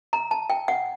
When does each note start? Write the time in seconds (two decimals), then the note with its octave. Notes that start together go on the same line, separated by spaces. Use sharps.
0.13 A#5
0.31 A5
0.50 G5
0.68 F#5